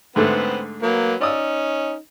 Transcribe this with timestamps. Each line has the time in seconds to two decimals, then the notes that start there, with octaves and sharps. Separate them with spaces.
0.16 G#2 D3 A3 B3 C4 B4
0.83 F#3 A#3 B4
1.21 C#4 D#4 D5 D#6 E6